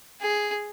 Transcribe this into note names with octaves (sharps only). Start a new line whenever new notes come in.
G#4